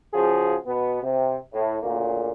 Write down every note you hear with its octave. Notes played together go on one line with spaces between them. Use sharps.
C#3 F3 F#4 G#4
B2 B3
C3
A2
D2 A#2 C#3 A#3